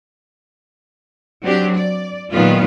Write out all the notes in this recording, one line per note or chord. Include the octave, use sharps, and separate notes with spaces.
F#3 C4 D4 G4
D5
A#2 D#3 F#3 G#3 B3 F4